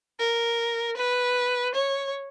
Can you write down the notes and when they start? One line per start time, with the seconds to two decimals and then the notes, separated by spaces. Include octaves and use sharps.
0.19 A#4
0.97 B4
1.75 C#5